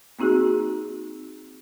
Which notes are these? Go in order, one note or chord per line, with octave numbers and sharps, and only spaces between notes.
A#3 C4 D#4 F#4 G#4